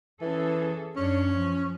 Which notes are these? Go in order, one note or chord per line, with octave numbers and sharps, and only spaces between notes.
E3 C#4 G#4 A4
F#2 C#4 D4 C#5
F3